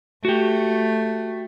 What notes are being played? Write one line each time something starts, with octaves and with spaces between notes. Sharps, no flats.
A3 F#4 G4